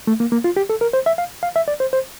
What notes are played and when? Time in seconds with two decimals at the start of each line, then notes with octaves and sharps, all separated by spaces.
0.07 A3
0.20 A#3
0.32 A#3
0.44 F4
0.56 G4
0.70 A4
0.81 A#4
0.93 C5
1.06 E5
1.18 F5
1.43 F5
1.56 E5
1.68 D5
1.80 C5
1.93 C5